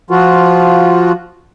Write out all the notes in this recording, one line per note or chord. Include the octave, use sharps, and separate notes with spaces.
F3 F4 F#4